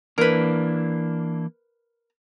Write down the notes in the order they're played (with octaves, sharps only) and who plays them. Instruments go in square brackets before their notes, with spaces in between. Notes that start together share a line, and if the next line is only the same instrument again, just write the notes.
[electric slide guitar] E3 A#3 D4 [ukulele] A#4 B4